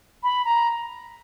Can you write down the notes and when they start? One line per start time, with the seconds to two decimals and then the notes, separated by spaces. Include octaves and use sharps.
0.23 B5
0.45 A#5